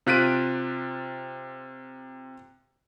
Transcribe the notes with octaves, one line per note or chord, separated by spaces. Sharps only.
C3 F4 F#6 B6 D7 D#7